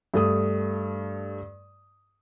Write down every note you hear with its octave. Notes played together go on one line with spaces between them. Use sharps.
G2 A3 D#6